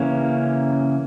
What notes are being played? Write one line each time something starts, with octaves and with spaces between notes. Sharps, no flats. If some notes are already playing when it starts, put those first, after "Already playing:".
Already playing: C#3 E3 A#3 C#4